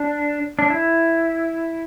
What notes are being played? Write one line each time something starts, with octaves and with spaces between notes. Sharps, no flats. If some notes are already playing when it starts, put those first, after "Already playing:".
Already playing: D4
D4
E4